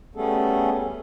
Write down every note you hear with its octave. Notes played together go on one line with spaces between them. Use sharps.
G3 A3 B3 C#4 G#4 A4